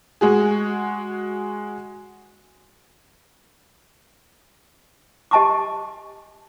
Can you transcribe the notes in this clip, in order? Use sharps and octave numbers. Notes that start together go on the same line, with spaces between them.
G#3 F#4 G#4
G4 D#5 G#5 A5 C#6 D6